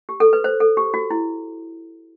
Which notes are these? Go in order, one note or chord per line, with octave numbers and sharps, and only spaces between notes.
G4
A4
B4
C5
A4
G4
F#4
E4